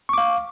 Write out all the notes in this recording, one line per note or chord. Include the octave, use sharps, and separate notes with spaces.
F5 C#6 D6